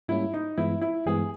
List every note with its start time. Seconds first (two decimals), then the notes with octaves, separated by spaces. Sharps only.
0.08 G#2 G3 A#3 C#4 E4
0.34 D#4
0.58 G2 E3 G#3 B3 E4
0.81 E4
1.06 G2 E3 G#3 B3 G#4